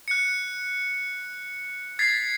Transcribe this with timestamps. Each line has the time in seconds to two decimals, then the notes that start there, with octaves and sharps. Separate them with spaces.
0.08 F#6 C#7
1.99 G#6 A6 B6 C7